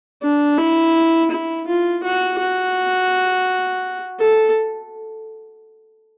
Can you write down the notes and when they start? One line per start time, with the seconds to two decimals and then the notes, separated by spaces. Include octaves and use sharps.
0.23 D4
0.58 E4
1.31 E4
1.67 F4
2.03 F#4
2.39 F#4
4.19 A4